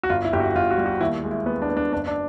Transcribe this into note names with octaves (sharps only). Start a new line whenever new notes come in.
F#4
G1 F4
E4
G1 G4
F#4
G1 F4
F#4
G3
F#4
D#2 E4
G#3
E4
B3
D4
B3
D4
F#1 D4
D4